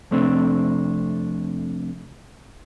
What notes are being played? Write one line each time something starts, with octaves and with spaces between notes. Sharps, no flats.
F2 C3 A3 C4 D4